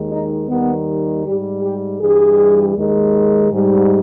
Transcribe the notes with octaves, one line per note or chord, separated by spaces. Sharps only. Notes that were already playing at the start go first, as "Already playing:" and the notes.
Already playing: D#2 D#3 G#3
D#4
D#2 D#3 G3 B3
G#2 G3 G4
G4
G2 E3 G3 G#4
D#2 D#3 G#3
G#2 G3